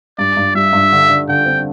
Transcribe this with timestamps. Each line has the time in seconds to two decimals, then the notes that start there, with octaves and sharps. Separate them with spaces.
0.18 G2 D5
0.37 G2
0.55 G3 E5
0.73 G2
0.92 D3
1.10 D3
1.28 D3 G5
1.46 C4